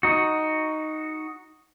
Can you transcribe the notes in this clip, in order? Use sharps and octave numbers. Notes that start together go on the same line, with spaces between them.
D#4 F#4